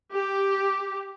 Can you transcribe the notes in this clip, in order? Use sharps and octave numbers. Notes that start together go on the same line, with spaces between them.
G4